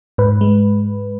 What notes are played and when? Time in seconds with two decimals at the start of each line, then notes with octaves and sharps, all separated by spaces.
0.18 G#2 B4
0.41 G#3